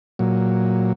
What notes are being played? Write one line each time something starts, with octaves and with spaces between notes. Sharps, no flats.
A#2 F#3